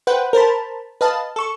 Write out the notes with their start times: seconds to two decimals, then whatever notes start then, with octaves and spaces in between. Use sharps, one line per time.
0.07 B4 C5 F#5 G5
0.33 A#4 C5 A5 B5
1.01 B4 D#5 F5 A5
1.36 A4 C#6